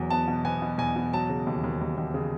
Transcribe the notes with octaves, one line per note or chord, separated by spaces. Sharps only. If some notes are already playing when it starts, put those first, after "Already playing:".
Already playing: E2 F#3
B3 A5
B2
B3 G#5
B2
E2 G#5
B2
F#3 A5
C#3
D#2
D#2
D#2
D#2
C#3